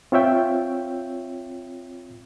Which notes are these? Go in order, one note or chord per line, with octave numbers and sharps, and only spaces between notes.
C4 F4 C#5 E5 G5